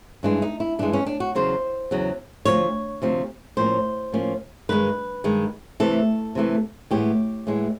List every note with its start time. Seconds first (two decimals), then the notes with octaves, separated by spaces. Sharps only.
0.23 G2 E3 G#3 D4
0.42 D#4
0.60 E4
0.79 G2 E3 G#3 D4
0.93 C#4
1.06 D4
1.20 F#4
1.35 E2 C#3 F#3 C5
1.91 E2 C#3 F#3
2.45 D2 C3 F3 C#5
3.02 D2 C3 F3
3.57 A2 F3 A#3 C#4 C5
4.12 A2 F3 A#3 C#4
4.69 G2 D#3 G#3 B4
5.24 G2 D#3 G#3
5.80 C3 E3 A3 A4
6.35 C3 E3 A3
6.91 A2 E3 G#3 B3 G4
7.47 A2 E3 G#3 B3